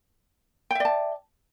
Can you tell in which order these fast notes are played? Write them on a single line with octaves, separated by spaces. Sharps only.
G5 E5 D5 A5